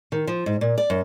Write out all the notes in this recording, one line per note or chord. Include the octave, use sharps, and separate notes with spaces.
D#3
F3
G#2
A#2
D5
F#2